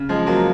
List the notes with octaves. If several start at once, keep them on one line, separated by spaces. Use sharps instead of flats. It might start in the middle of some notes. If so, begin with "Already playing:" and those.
Already playing: C#3
F3 G#3
F#3 A#3